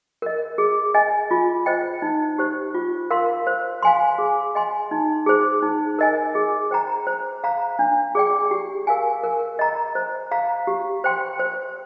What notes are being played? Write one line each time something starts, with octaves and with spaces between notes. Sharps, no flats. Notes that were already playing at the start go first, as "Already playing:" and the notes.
A#4 D#5
G#4
D#5 G#5
F4
C5 D#5 G5
D#4
G4 C5
F4
A#4 F5 C6
C5
F5 G#5 C6
G#4
D#5 G#5 C6
D#4
G#4 C5
D#4
A#4 D#5 G#5
G#4
C5 G5 A#5
C5
F5 A#5
D4
G#4 D5 G5
G4
A#4 F5 G#5
A#4
D#5 A#5
C5
F5 A#5
G4
C5 G5 C6
C5